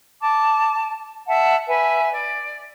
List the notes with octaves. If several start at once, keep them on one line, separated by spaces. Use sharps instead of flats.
A5 D6
E5 F#5 A5
B4 E5 G#5
D5